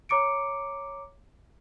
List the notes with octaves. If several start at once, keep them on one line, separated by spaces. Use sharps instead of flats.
C#5 A#5 D6 C#7 D7